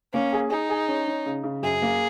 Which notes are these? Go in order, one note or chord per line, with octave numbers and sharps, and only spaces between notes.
A#3 C#4
G#4
D#4 G#4
G#4
C#4
C#4
C#3
C#3
F#2 G#4
A#3